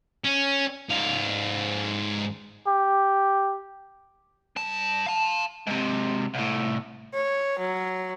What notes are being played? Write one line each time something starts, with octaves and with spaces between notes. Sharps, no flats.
C#4
G#2 F5
G4
G2 A5
F5 A5
G#2 C3
C2 A2
C#5
F#3